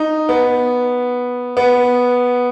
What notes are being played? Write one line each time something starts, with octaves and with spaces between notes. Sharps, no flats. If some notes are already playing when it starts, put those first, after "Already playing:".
Already playing: D#4
B3
B3